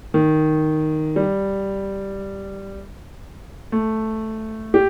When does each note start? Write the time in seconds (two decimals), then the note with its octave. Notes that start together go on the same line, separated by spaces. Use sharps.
0.14 D#3
1.16 G3
3.72 A3
4.74 G4